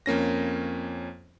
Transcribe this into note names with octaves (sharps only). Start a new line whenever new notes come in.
F2 A#3 C#4 A#6